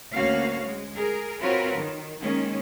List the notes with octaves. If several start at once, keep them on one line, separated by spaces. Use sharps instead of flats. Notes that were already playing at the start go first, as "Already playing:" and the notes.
D2 A#3 C#4 F#4 F5
G#3
G#4 A#4
C4 F4 F#4 A#4 B4 C#5
D#3
D#3 G#3 A#3 C#4